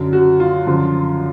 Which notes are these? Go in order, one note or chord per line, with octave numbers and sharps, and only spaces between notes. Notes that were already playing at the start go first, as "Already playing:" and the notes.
Already playing: F#2 D3 F#3
F#4
F4
F#2 D3 F3